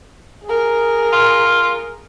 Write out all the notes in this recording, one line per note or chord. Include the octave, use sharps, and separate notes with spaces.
G#4 A#4
F4